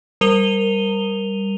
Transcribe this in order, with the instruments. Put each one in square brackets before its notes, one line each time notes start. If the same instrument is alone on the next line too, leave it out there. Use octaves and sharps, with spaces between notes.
[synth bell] G3 A#4 D#7 F7 G7